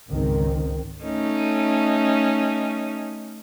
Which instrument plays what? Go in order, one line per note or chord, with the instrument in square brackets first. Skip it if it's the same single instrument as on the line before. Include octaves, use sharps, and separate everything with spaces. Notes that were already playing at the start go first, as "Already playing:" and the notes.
[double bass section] G#1 C#2 D#3 C4
[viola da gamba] A3 C#4 D#4